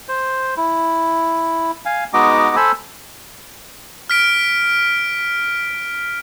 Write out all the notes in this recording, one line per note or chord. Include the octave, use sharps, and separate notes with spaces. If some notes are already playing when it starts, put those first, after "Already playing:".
C5
E4
F5 G#5
G#3 B3 D#4 F#4 D#5 D6
A4 C5 G#5 B5 E6
F6 B6 D7